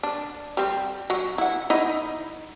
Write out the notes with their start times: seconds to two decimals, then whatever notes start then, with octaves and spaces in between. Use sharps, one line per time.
0.03 D4
0.57 G3 C4
1.10 F#3
1.38 E4 F#5
1.70 D#4 E4 D#5